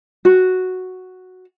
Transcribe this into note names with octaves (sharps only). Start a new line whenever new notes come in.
F#4